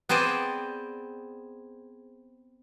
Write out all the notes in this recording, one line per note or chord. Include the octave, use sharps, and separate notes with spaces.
B3 C4 G#4 C5 D5